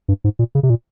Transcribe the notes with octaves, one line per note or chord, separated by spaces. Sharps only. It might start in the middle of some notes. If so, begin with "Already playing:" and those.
G2
G#2
A#2
C#3
C3
A#2